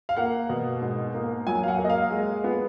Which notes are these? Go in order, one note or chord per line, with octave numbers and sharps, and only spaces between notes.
F5
A#3 F#5
B2
G#2
A#3
F#3 G#5
F5
F#5
A#3
D#5
F5
G#3
B3